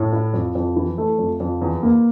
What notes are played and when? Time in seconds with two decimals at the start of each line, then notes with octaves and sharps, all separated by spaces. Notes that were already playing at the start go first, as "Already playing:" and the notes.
Already playing: A2
0.13 E4
0.34 F2
0.55 F2
0.76 E3
0.98 A3
1.19 F2
1.40 F2
1.62 E2
1.83 A#3